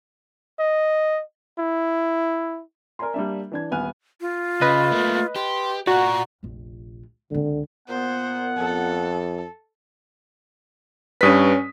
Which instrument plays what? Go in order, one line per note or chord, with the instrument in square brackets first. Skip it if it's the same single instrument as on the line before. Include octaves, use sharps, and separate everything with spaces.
[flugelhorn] D#5
E4
[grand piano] A#4 D5 G#5 A#5 C6
G3 A#3 D4 E5
E3 D4 G#6
D#1 B3 G#5 F6 F#6
[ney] F4
[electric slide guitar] C#3 [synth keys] B4 D#5
[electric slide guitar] A3 A#3
[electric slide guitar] G4 [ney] C6
[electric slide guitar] F4 D5 [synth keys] F#4 [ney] A#5
[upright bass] F1 A#1
[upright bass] C#2 C4 [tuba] D3
[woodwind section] A#2 B3 [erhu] C5 [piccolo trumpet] F#5
[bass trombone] F2 [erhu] A4
[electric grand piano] G2 B4 [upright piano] C#4 D#6 B6